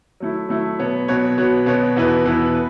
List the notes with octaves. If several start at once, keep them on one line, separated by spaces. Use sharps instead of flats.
F#3 A3 E4
F#3 A3 E4
B2 F#3 B3 F#4 C#5
B2 F#3 B3 F#4 C#5
B2 B3 F#4 C#5
B2 B3 F#4 C#5
E2 B2 B3 E4 B4
E2 B2 B3 E4 B4
B4